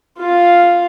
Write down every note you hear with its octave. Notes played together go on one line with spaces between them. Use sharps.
F4 F5